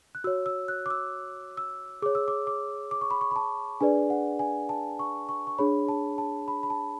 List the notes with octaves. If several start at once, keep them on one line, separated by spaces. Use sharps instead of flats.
F#6
F#4 C#5 E6
E6
F#6
D6
E6
E6
G#4 C#5 D6
E6
D6
D6
D6
C#6
B5
C#6
B5
A5
D4 G#4 B4 D5 G#5
F#5
G#5
A5
C#6
C#6
C#6
D4 G#4 C#5 B5
A5
A5
B5
B5
A5